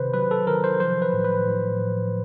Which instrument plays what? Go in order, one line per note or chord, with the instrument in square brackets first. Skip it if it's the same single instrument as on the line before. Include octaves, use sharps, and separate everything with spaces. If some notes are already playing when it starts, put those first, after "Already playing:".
Already playing: [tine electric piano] C3 D#3 B4 C5
F#3 B4
A4
D#3 A#4
C5
F3 C5
B4
A2
B4
A2
F3